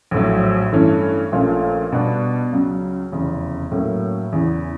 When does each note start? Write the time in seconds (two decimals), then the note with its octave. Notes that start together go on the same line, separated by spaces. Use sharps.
0.11 A#1 A2 F#3
0.72 G2 E3 A3 C#4
1.32 A#1 A#2 F3 A3 C#4
1.92 B2 G3 B3 D4
2.52 C#2 C#3 F#3
3.12 F1 E2 C#3
3.71 A2 F#3 A#3 C#4
4.32 E2 C#3 E3